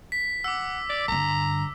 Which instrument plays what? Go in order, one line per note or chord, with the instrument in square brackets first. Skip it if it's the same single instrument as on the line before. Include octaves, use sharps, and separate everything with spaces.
[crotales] B6
[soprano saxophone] F#5 [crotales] D6 E6
[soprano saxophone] D5
[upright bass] G2 D3 [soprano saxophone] A#5